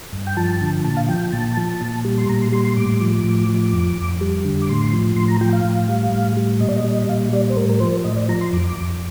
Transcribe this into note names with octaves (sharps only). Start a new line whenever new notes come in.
G2
G5
F3 A5
D3
A#2 A5
F5
F3 G5
A#2 A5
F3
A#2
G3
C6
A#2 A#5
C6
G3 C6
C6
A2 D6
F3
A2
F3
F2
F2
G3
D3
D6
A2 C6
F3
A2 C6
A#5
F3 G5
F5
A2
G3
A2
G3
A#2 D#5
D5
D#5
G3
D#5
A#2 F5
G3 D5
C5
A2 A#4
A#4
F3 C5
A2 D#5
D5
F3 A#5
C6
F2 D6
F2